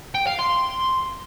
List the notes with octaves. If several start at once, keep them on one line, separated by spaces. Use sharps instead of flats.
G5
F5
C6